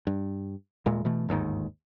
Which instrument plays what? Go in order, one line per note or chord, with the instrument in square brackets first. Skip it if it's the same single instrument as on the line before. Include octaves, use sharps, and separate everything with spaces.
[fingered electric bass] G2
D#1 A#2 G#3
B2 E3 A3
G1 D#2 G#2 D#3